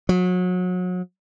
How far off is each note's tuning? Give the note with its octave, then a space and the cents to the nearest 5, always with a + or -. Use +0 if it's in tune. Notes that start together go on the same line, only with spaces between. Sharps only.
F#3 -30